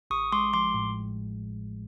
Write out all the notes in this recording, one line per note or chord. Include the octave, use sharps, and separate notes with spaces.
A1 C#6 D#6
G#3 C6 D6
F3 C6 D6
A2